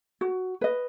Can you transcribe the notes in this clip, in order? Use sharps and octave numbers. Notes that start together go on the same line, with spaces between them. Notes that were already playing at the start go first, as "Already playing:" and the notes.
F#4
B4 D#5